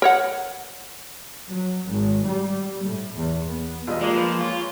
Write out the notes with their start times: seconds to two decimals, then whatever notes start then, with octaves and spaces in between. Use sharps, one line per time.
0.02 A#4 C#5 F#5
1.49 F#3
1.88 G#1
2.25 G3
2.84 A2
3.16 E2
3.50 B3
3.87 E1 G3 F4 D#5
4.01 G#3 A#3 D4 G4
4.13 F3 G#3 B4
4.41 F4 C#5